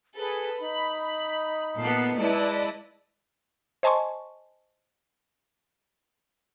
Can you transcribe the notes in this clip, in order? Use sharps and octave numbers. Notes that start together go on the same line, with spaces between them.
G#4 A4 B4
D#4 B5
A#2 B3 A4 C7
G#3 E4 B4 D5 D#5 A5
C5 D#5 G#5 A5 C6 C#6